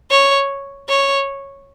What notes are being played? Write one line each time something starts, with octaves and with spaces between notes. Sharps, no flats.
C#5
C#5